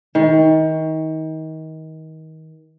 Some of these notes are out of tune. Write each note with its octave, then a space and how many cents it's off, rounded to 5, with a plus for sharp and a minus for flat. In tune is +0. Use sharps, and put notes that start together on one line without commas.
D#3 +30